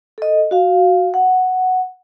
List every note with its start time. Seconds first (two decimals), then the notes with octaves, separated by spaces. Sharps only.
0.18 A4 D#5
0.51 F#4 F5
1.14 F#5